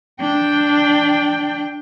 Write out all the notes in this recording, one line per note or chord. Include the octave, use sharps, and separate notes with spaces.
D4 G5